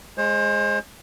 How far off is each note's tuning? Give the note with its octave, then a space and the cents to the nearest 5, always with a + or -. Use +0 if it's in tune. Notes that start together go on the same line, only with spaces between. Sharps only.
G#3 +0 C5 +30